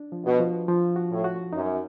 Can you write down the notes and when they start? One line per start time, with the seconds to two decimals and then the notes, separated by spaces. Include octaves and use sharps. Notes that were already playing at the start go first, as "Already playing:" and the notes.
Already playing: D4
0.12 F3
0.25 B2
0.40 F3
0.68 F3
0.96 F#4
1.11 A2
1.24 F#4
1.52 F#2 D#4